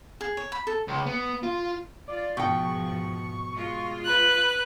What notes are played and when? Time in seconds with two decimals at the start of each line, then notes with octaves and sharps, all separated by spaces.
0.21 G#4
0.37 C#5
0.52 B5
0.67 A4
0.88 C#2
1.07 B3
1.43 F4
2.08 F4 D5
2.37 G#2 B2 F3 G5 C#6
3.54 G#3 F4
4.05 B4 F#6